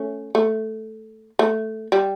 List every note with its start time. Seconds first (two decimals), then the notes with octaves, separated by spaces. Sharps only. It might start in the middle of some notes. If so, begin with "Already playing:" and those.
Already playing: A3 C#4
0.35 A3
1.39 A3
1.92 G3